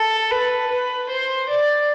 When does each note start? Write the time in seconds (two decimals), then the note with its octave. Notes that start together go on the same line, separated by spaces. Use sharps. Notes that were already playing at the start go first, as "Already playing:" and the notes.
Already playing: A4
0.31 B4
0.70 B4
1.09 C5
1.49 D5